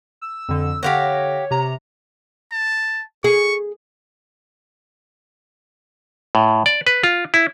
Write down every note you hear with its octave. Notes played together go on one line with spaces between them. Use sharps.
E6
F2 D3 E6
D3 G4 C#5 F5 F#5 A#6
C3 A#5
A5
G#4 C#6
A2
D5
B4
F4
E4